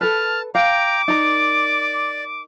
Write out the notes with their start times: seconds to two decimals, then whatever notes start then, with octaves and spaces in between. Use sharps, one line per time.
0.01 A4 B4 A5 F6
0.55 F5 G5 A#5 D6
1.08 D#4 A#4 D5